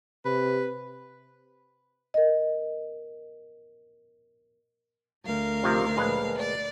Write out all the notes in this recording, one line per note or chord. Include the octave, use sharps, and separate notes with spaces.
C3 B4
A#4 D#5
D2 A#4 F5
C3 D#3 F3
A#1 G#3 B4
D5